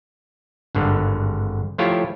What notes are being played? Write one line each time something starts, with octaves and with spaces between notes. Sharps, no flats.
G#1 G2 D3
F3 A3 E4 F4 G4 C#5